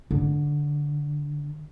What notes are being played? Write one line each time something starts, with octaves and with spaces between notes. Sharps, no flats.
D3